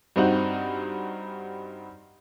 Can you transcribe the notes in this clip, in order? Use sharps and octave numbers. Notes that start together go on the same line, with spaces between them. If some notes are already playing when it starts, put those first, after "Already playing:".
G2 C4 D#4 F#4